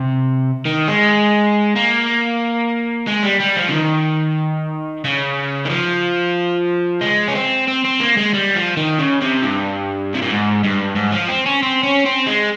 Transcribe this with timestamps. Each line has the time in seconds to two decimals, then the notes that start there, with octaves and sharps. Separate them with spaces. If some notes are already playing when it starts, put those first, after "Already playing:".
Already playing: C3
0.66 D#3
0.88 G#3
1.76 A#3
3.08 G#3
3.23 G3
3.40 G3
3.57 F3
3.69 C#3
3.72 D#3
5.05 C#3
5.65 D#3
5.70 F3
7.01 G#3
7.28 C#4
7.35 C4
7.67 C4
7.84 C4
8.00 A#3
8.17 G#3
8.34 G3
8.55 F3
8.77 D#3
8.99 C#3
9.21 C3
9.43 G2
10.15 C3
10.22 A#2
10.31 G#2
10.64 G2
10.96 G#2
11.12 F3
11.28 C4
11.46 C#4
11.63 C4
11.83 C#4
12.06 C4
12.27 G#3